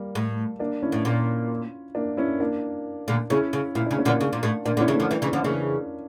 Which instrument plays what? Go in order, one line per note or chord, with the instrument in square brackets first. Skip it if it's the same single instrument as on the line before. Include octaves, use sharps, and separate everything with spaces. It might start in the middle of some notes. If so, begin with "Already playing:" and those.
Already playing: [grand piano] G3 A#3
[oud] A2
[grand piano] A#3 D4
C#4 E4
[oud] A2
A#2
[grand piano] A#3 D4
C#4 E4
A#3 D4
[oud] A#2 D3
[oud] C#3 [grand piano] C#4 E4
[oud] C#3
[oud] A#2 [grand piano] E4
[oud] C#3 [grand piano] D4
[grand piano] C#4
[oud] A#2 D3
[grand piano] A#3 D4
[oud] C#3
A#2
A2
[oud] A#2 [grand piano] A#3 D4
[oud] A#2 D3
[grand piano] C#4 E4
[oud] C#3 E3
[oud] D3 F3 [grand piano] A3 C#4
[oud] E3 G3 [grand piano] E4
[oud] C#3 E3 [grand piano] D4
[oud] D3 F3 [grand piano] C#4
[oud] C#3 E3 [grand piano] A#3 D4